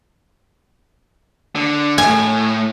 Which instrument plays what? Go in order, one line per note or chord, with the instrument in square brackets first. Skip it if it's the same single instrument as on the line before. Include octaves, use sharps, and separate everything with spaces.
[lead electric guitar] D3
[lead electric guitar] A2 [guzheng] G#5